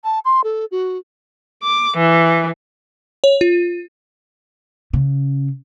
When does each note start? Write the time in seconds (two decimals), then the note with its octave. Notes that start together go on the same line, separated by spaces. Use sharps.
0.04 A5
0.25 C6
0.44 A4
0.71 F#4
1.63 D6
1.96 E3
3.24 C#5
3.41 F4
4.93 C#3